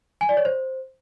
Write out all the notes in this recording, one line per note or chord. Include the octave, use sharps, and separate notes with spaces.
G#5
D5
C#5
C5